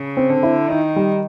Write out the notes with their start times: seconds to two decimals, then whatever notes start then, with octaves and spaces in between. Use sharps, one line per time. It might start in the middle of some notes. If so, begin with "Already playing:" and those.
Already playing: C#3
0.17 C4
0.29 D3
0.43 E4
0.69 D#3 D#4
0.96 G3